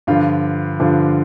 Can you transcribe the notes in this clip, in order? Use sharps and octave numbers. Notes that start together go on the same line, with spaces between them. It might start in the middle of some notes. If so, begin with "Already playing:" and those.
G2 D3 F3 F4
G2 D3 F3